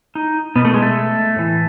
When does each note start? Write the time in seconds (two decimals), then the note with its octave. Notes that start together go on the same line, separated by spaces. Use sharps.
0.15 D#4
0.56 B2 B3
0.65 A3
0.74 G#3
0.82 A3
1.36 A2 E3